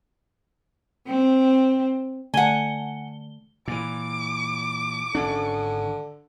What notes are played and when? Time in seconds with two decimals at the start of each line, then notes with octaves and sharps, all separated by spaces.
1.07 C4
2.34 D3 A3 F#5 G#5 G7
3.68 A#2 E3 D6
5.15 G#1 D3 C#4 D4